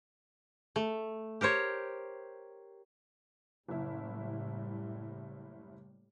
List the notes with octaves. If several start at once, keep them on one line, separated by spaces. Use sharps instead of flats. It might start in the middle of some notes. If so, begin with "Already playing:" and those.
A3
G4 A#4 C5 C#5
F#1 A2 G3 E4